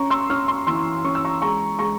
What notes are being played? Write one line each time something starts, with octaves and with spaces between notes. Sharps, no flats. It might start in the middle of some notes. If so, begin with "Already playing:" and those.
Already playing: C#4 A#5 C#6
C6 E6
C#4 C#6 F6
C6 E6
E3 C6 E6
C#4 C#6
E6
A#5 C#6
G#3 A#5 C#6
G#3 A#5 C#6